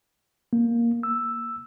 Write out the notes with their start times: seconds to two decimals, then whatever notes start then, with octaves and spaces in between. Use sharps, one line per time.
0.53 A#3
1.03 E6